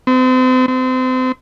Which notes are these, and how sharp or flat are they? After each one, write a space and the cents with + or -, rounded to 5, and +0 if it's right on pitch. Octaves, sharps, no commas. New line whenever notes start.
C4 -35
C4 -30